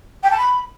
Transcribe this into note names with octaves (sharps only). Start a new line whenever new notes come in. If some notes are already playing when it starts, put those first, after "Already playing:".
G5
A5
B5